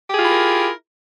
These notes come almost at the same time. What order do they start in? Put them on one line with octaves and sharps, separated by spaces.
G4 G#4 F4 E4 A#4